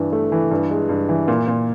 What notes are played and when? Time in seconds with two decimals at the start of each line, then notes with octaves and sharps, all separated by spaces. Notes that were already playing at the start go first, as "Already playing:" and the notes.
Already playing: G2 E3
0.13 A3
0.32 E3
0.51 G2
0.71 G#3
0.89 G2
1.09 E3
1.28 A#2
1.48 A#2